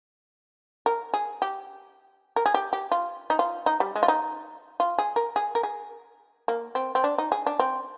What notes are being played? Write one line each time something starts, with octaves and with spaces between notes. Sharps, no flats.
A#4
G#4
G4
A#4
G#4
G4
G4
F4
D#4
F4
D#4
G3
G#3
F4
D#4
F4
G#4
A#4
G#4
A#4
G#4
A#3
C4
C4
D4
D#4
G#4
D4
C4